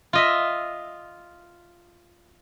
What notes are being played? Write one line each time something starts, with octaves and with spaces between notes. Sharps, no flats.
F4 D#5 E5